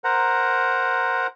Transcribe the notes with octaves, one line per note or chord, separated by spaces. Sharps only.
A#4 C5 F#5 A#5